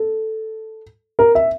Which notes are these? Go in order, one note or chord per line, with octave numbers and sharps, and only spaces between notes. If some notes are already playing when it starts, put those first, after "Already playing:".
Already playing: A4
A#4
E5